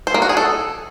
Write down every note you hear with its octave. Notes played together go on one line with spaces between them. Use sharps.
C5
A#3
F#4
G#4
A4